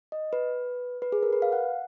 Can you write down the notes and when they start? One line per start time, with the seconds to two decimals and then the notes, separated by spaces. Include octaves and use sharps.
0.12 D#5
0.33 B4
1.02 B4
1.12 G#4
1.23 A#4
1.33 B4
1.42 F5
1.52 F#5